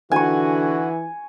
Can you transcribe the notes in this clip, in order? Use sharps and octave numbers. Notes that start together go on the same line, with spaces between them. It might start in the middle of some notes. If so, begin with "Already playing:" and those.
D3 E3 F#4 G#5 C#6